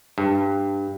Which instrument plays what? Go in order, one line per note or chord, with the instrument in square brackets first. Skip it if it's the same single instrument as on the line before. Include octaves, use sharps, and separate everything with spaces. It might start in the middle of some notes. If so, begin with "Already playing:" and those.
[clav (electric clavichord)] G2